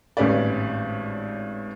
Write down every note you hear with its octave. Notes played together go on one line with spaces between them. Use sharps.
G#1 A2 G3 C#4 B4 D5